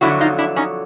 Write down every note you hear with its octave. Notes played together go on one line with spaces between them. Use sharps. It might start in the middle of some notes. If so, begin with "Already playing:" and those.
F2 D3 F#3 E4 F#4
D#4 F4
D4 E4
C#4 D#4